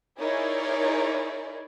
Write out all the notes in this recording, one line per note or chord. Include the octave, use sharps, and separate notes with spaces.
D#4 E4 G#4 A#4 C#5 D5